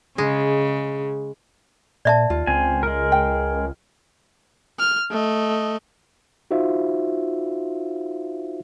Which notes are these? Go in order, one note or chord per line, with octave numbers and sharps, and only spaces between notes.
C#3 G#3
A#2 D5 E5 A5
D#2 F4
C#2 C4 G#5
G#3 A#4
G5
F6
A3 D#5
D#4 F4 F#4 C5 E5 F5